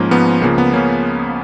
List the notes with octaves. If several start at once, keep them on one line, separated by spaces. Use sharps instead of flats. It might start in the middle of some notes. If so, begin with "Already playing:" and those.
Already playing: G#2 F3 A#3 C#4
G#2 F3 B3
C#2 C#3 F3 A#3
B3
C#3 A#3 C#4